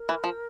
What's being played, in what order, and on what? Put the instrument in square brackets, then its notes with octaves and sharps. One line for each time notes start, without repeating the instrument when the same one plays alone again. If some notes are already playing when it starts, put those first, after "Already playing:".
Already playing: [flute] A#4
[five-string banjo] E3
F3